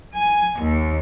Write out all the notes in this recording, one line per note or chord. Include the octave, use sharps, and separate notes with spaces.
G#5
D#2